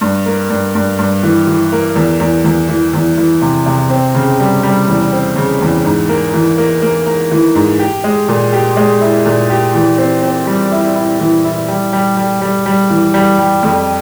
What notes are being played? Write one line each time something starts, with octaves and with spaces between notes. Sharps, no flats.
G2
A#3
G2
G2
G2
E3
E3
A#3
E2
E2
E2
E3
E2
E3
C3
C3
C4
C#3
G3
G3
E2
C4
C#3
E2
G#2
A#3
E3
A#3
A#3
A#3
E3
G#2
G4
G#3
A#2
G4
G#3
E4
A#2
G4
E3
C4
C4
G3
E4
E4
E3
E4
G3
G3
G3
G3
G3
E3
G3
G3
F2